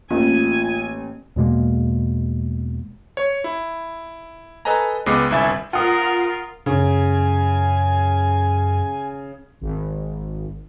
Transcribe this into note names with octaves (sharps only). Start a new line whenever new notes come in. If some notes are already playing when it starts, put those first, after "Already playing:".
A1 A#3 F4 G#5
E2 B2 G#3 A#3
C#5
E4
A4 B4 D#5 G#5 A#5
C#2 G#3 B3 D#5 D6 C7
G1 C2 E4 E5 G#5 A6
F4 A#4 F#5 D#6
F#2 C#3 G#5
G#1